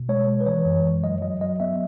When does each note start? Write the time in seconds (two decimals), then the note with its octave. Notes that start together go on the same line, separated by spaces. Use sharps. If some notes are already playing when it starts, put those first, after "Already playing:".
Already playing: B2
0.09 G#3 C#5
0.28 G#3
0.41 B4
0.46 E3 C#5
0.65 F#2
0.84 F#2
1.04 F#3 D#5
1.22 F#3 D#5
1.41 F#3 D#5
1.60 B3 E5